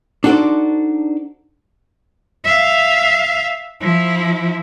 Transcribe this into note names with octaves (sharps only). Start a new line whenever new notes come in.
D4 D#4 F#4 A4 C5 D5
E5 F5
F3 E4